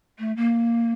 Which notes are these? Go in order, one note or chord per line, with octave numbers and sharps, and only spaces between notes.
A3
A#3